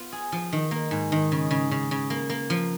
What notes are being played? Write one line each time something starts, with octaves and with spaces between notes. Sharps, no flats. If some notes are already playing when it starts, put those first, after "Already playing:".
Already playing: B3 F4
G#4
F3
D#3
A#3
G#2
D#3
C#3
C#3
C#3
C#3
A#3
A#3
F3